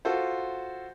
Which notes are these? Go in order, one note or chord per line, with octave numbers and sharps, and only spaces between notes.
F4 F#4 A4 C5